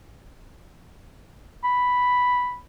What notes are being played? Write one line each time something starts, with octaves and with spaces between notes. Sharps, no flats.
B5